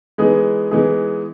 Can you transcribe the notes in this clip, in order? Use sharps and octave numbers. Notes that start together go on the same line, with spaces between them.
E3 G#3 B3 D#4 G#4
E3 G#3 B3 D#4 G#4